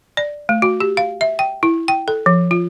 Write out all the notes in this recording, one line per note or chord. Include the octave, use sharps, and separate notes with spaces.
D5
A3
F#4
G4
F5
E5
G5
E4
G5
A4
F3
F4